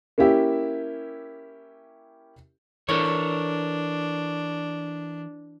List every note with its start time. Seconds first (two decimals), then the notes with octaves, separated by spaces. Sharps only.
0.18 A#3 C#4 E4 G4 E5
2.89 E3 D4 A4 A#4 C#5